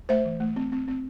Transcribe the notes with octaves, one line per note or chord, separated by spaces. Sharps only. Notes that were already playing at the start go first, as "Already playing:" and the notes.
A3 C5 E5
E3
A3
C4
C4
C4